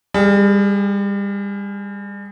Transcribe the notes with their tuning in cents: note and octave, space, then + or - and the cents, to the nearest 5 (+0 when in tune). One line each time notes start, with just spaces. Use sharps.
G3 +35 G#4 +10